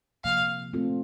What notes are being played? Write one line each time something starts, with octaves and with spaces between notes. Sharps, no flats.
C3 F3 A#3 F5
A3 C4 F4 A4